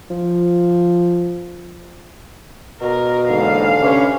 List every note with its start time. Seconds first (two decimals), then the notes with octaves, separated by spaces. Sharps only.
0.10 F3
2.81 B2 A#4
3.29 D#2 G#2 D3 E3 F5
3.82 C3 C#4 B4